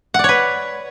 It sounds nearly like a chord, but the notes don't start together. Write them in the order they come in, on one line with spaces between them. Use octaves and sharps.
F#5 D5 C#5 B4